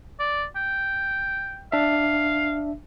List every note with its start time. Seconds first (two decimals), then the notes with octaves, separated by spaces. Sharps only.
0.19 D5
0.56 G5
1.72 D4 E5 F5